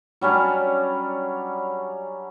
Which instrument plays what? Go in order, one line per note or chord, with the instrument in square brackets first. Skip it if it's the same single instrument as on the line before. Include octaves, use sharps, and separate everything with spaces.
[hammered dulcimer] F#3 G3 C#4 D4